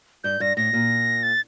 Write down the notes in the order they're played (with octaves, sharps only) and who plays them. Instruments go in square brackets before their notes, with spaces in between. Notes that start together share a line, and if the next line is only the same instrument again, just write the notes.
[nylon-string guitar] G2 [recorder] G6
[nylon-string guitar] G2 [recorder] A#6
[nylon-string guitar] A2 [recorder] A#6
[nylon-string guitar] A#2
[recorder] A6